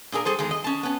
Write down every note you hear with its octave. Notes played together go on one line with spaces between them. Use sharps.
A#2 D4 G#4 A#4
G3 G#4 A4 C5
E2 D#3 G#3
D#5
C#4 A5
B3 C#4